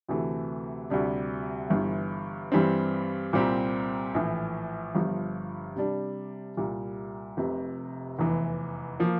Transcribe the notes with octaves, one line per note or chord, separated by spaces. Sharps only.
D2 C3 E3 A3
D2 C3 G3 D4
G1 G2 E3
G2 E3 G3 C4
C2 A#2 G3 C4 G4
A#1 A2 E3
G1 G2 F3
C3 G3 D4
C2 A#2 G3
F1 F2 C3
F1 E2 E3
F3 A#3